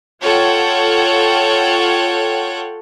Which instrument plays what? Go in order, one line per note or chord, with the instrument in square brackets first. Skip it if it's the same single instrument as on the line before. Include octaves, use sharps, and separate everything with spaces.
[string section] F4 A4 C#5 F#5 G5